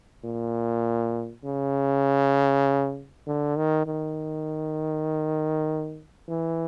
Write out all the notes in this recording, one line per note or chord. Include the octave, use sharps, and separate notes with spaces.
A#2
C#3
D3
D#3
D#3
E3